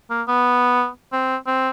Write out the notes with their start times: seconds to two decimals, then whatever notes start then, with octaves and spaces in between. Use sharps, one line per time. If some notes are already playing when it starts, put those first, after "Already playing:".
0.10 A#3
0.28 B3
1.13 C4
1.47 C4